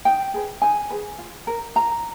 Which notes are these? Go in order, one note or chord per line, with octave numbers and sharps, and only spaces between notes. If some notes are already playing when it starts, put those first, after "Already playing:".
D#4 G5
G#4 B4
D#4 G#5
G#4 B4
F4
A#4
F4 A#5